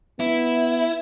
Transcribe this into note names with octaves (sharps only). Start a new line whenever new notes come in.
B3 E4